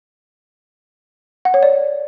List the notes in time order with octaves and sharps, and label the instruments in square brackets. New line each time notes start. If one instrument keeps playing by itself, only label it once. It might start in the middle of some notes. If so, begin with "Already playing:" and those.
[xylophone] F#5
C#5
D5